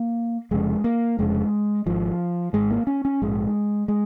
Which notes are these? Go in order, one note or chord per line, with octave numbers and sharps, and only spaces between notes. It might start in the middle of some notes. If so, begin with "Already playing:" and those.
Already playing: A#3
F1 F2 C#3 G#3
A#3
F1 F2 C#3 G#3
G#1 G#2 F3
G#1 G#2 G#3
A#3
C#4
C#4
A#1 G#2 G#3
G#3